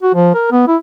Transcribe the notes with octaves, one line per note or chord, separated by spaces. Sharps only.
F#4
F3
A#4
B3
E4